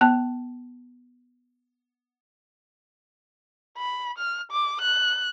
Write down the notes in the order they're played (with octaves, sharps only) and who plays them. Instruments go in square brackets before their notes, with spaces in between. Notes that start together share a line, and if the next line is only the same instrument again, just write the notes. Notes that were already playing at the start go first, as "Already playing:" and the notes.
[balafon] B3 A5
[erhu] B5
F6
D6
F#6